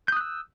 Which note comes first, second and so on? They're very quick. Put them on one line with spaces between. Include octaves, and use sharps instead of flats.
G6 D#6 F#6 E6